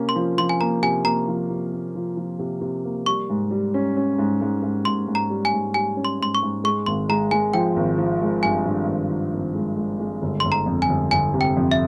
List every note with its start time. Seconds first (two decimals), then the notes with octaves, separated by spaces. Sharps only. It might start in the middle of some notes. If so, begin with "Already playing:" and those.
Already playing: C3 A#3 C#4
0.09 C6
0.16 F3
0.38 F3 C6
0.49 G#5
0.60 A#3 A#5
0.82 C3 G#5
1.05 A#3 A#5
1.28 F3
1.50 C3
1.73 A#3
1.95 F3
2.17 F3
2.39 C3
2.61 C3
2.85 A#3
3.06 G3 C#6
3.30 G#2
3.51 G3
3.74 C#4
3.97 C#4
4.18 G#2
4.41 G#2
4.62 G#2
4.85 G#2 C6
5.08 G#2
5.15 A#5
5.30 G3
5.45 G#5
5.53 G#2
5.74 G3 G#5
5.97 C#4
6.05 C6
6.20 G#2 C6
6.35 C#6
6.42 G#2
6.64 G#3 C#6
6.86 G#1 C6
7.09 G#3 A#5
7.31 G#3 G#5
7.54 F3 G5
7.76 G#1
7.98 F3
8.21 G#3
8.43 G2 G#5
8.66 G2
8.88 G#1
9.10 F3
9.33 G#1
9.55 G#3
9.77 G#3
10.00 G#3
10.22 G1
10.40 G1 C6
10.52 A#5
10.66 F2
10.82 G#5
10.89 G1
11.11 G1 G#5
11.34 C3
11.41 G5
11.57 F2
11.71 E5